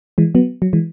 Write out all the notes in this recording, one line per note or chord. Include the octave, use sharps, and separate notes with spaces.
E3 G#3
F#3 B3
F#3
E3 G#3